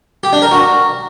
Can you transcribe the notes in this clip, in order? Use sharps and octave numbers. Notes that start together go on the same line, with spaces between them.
G4
D4
A#4
F#4